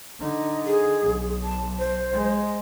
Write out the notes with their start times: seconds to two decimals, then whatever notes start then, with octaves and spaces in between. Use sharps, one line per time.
0.20 D3 D#4
0.66 G#4
1.01 B1
1.43 A5
1.78 C5
2.13 G#3